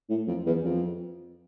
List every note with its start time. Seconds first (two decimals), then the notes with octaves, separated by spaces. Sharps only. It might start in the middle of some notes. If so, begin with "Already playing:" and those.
0.09 A2
0.27 F2
0.46 E2
0.65 F2